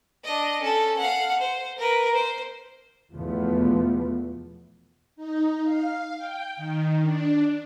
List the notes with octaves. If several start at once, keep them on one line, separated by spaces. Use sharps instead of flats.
D4 D#5
C#4 A4
F5 F#5
C5
A#4 B4
C5
E2 B2 F3 A3 B3
D#4
F5
G5
D#3
D4